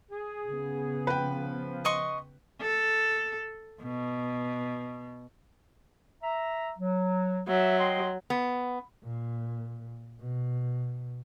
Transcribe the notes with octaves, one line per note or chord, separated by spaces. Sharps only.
G#4
C#3 B3
F3 B4 G5
D#5 C6 C#6
A4
B2
E5 A#5
F#3
F#3 E5
D#5 G5 C6
B3
A#2
B2